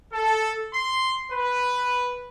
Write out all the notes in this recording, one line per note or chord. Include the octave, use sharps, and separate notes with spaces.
A4
C6
B4